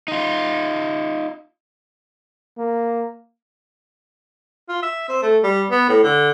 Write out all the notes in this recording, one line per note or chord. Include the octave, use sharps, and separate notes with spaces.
D#4 F4
A#3
F4
E5
C4
A3
G3
B3
A2
D3